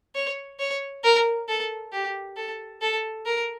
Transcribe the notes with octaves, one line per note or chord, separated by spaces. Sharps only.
C#5
C#5
A#4
A4
G4
A4
A4
A#4